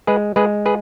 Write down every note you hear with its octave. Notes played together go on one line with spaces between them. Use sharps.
G#3 G#4 B4
G#3 G#4 B4
G#4 B4